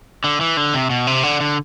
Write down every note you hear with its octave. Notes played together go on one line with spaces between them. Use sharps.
D3
E3
D3
C3
B2
C3
D3
D3